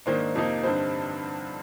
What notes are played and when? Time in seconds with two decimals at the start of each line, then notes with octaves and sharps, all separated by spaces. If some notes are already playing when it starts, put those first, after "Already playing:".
0.06 G#2 D#3 A#3 D4 C5
0.35 F2 C3 F3 A#3 D#4
0.63 G2 D3 G3 C4 D#4 C5